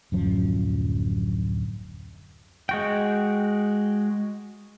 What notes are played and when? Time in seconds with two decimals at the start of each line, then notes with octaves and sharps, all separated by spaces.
0.12 D1 F#2 F3
2.69 G#3 F#4 G5